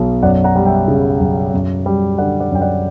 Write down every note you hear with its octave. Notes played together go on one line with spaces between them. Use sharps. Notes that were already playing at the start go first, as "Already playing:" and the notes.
Already playing: B1 B2
F#2 D5 F#5
F#5 A#5
G3
E5 G5
C#3
F#2
F#2
G3
D3 D5 F#5
D5 F#5
F#2 G5
D5 F#5